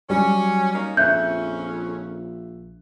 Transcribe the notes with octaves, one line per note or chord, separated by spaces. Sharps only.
F#3 G3 C#4
A#3 C#4 D#4
A#1 F2 C#4 E5 F#6 G6